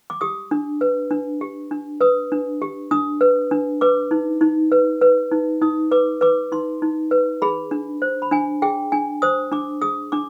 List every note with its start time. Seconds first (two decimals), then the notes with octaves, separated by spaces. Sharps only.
0.10 D6
0.21 G4 D#6
0.51 D4
0.81 B4
1.11 D4
1.41 G4
1.71 D4
2.01 B4 D#6
2.32 D4
2.62 G4
2.91 D4 D#6
3.21 B4
3.51 D4
3.81 B4 D6
4.11 D#4
4.41 D#4
4.72 B4
5.01 B4
5.31 D#4
5.61 D#4 D#6
5.91 B4 D6
6.21 B4 D6
6.52 D#4 C6
6.82 D#4
7.11 B4
7.42 G#4 B5
7.71 D4
8.02 C5
8.22 B5
8.31 D4 G#5
8.62 G#4 G5
8.92 D4 G#5
9.22 C5 D#6
9.52 D4 D6
9.82 G#4 D#6
10.12 D4 D6